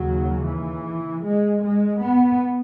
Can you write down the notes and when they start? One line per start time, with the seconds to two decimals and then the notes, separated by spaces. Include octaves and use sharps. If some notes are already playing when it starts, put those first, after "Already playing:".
Already playing: D#2 C#3 F#3
0.46 E3
1.24 G#3
1.63 G#3
2.02 B3